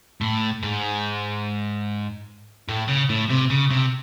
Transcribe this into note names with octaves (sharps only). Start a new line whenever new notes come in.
A2
G#2
A2
C#3
A2
C3
C#3
C3